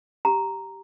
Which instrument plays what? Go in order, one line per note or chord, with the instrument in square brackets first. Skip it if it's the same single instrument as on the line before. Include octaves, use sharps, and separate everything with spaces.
[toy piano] G4 A#5